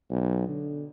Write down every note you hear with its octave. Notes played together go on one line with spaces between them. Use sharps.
B1
D3